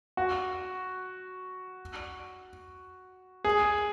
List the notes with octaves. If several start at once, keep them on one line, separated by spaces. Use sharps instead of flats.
F#4
G#4